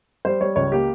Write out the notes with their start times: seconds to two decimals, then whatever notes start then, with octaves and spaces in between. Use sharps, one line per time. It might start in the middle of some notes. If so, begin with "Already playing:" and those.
0.25 G3 C5
0.40 G3 C#5
0.56 C#2 C#5
0.72 A#3 G4